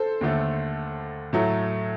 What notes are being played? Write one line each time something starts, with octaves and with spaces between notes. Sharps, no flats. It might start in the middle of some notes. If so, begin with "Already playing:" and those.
Already playing: A4 C5
D#2 D3 A3
A2 F#3 A3